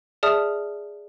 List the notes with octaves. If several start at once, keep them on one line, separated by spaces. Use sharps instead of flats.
G#4 D5 E5 A5 D#6 F6